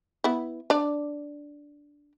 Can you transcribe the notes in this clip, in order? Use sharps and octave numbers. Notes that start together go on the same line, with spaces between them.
B3 E4
D4 D5